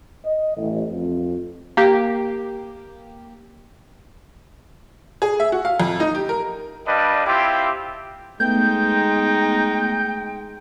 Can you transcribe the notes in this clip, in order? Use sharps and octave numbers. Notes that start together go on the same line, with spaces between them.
D#5
A1
F2
A#3 G4
G#4
E5
F#4
F5
F2
D#4
G4
A#4
G3 D4 B4 D#5 F5
C4 E4 F4 G4
G#3 A3 B3 D#4 G5 G6